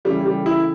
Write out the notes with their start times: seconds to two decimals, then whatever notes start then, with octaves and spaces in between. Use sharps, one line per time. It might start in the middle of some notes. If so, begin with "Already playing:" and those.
0.05 C#3 E3 G3 A3 C#4 G4
0.26 G3
0.46 E4